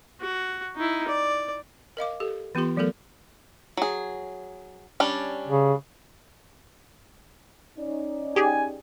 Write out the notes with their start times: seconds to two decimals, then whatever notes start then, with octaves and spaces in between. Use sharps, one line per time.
0.21 F#4
0.76 D#4 E4
1.08 D5
1.97 A#4 D#5 F5 D6
2.20 G4 A4
2.55 E3 B3 F4 G4 C6
2.77 E3 F#3 A3 B3 A4 A#4
3.77 F#3 G#4
5.00 G3 C#4 D4
5.48 C#3
7.78 C#4 D#4 D5
8.36 G4 G#4 G#5